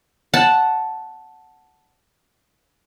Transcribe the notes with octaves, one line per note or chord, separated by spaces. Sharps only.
F#5 A5